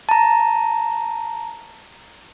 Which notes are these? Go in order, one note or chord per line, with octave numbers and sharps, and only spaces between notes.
A5 A#5